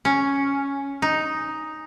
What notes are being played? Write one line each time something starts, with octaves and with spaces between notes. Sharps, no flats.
C#4
D#4